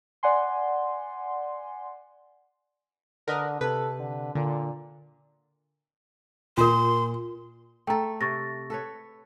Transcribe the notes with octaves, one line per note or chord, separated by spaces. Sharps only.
D5 F#5 G#5 C6
D3 A#4 B4 D#5
C3 A4 B4
D3
A#2 D3
A#2 F4 A#4 C6
A3 A4 G5 A#5
C3 C#6 A6 A#6
A4 B4 C#5